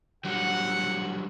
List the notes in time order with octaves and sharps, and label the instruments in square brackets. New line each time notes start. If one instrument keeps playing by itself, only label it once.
[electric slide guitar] D3 F#3 G3 [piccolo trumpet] F#5